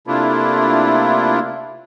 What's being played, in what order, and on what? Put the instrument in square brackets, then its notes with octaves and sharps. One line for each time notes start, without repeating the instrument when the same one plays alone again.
[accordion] C3 A3 A#3 D4 E4 F4